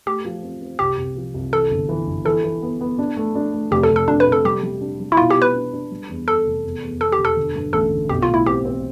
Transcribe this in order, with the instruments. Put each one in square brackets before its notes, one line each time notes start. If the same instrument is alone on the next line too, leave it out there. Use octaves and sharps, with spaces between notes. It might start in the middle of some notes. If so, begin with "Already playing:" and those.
[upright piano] A3 [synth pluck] G4
[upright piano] F3
C4
C4
[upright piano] C2 [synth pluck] G4
[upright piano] C2
F3
C2
[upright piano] E3 [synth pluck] A4
[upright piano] G1
E3
G1
[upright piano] E3 [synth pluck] A4
[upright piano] E3
B3
B3
D4
A3
D4
A3
[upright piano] F1 [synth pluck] G4
[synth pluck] A4
[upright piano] F1
[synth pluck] A4
[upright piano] F1 [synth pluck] D4
[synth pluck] B4
[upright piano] C3
[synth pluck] A4
[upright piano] G3 [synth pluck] G4
[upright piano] G3
D4
G3
[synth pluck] E4
[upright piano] B2 [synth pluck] F4
[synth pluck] G4
[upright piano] B3
[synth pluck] B4
[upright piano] D4
D4
G3
E2
[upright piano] E2 [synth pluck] A4
[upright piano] F1
E2
E2
[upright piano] E2 [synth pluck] A4
[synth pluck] G4
[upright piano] E1
[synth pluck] A4
[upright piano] D3
G2
[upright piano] A1 [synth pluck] A4
[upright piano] D3
[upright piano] B1 [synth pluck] G4
[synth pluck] F4
[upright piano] A2
[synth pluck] E4
[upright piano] C4 [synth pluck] G4
[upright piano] C4